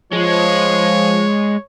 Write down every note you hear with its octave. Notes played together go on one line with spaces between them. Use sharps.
F3 G#3 C#5